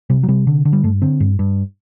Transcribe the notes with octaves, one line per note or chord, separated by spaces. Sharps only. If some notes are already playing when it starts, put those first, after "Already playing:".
C3 G3
F#3
C3 G3
D3
D3
G3
G2 A3
D3 C4
G2
G2